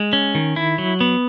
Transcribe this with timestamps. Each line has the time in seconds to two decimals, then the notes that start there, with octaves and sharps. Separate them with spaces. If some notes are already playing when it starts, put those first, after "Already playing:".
Already playing: G#3
0.13 C#4
0.35 D#3
0.56 E4
0.78 F#3
1.01 B3